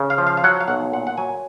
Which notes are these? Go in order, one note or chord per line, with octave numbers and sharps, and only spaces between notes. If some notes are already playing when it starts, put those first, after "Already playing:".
Already playing: C#3
F5
F3
F5
F5
F#3 F#5
F5
B1 F#5
A#2 F#5
F#5
F#3 G#5